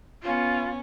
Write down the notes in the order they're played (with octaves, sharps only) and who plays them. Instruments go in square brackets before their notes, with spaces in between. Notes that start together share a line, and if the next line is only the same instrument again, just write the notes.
[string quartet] B3 C#4 [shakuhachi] F4